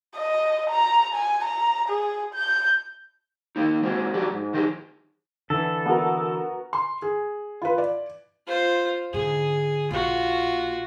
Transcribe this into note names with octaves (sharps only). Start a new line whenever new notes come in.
D#5
A#5
G#5
A#5
G#4
G6
D#3 A#3 D#4
G#3 C4 F4 F#4
F#3 D4 F#4 G4
G#2
D#3 F3 D#4 G4 G#4
D3 E3 A4
B3 F#4 A#4
C6
G#4
F4 B4
D5
F4 C5
G#2 D3 G#4
A#1 F4 F#4